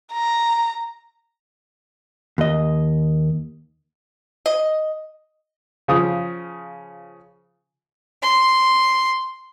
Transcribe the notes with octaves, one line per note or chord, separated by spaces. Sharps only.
A#5
D#2 D#5
D#5
C#3 F3 D#6
C6